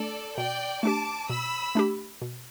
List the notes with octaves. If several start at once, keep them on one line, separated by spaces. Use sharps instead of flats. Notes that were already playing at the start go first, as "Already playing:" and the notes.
Already playing: A3 D4 A4 D5
B2 D5 G5
A3 D4 G4 A5 D6
B2 B5 E6
A3 D4 G4
B2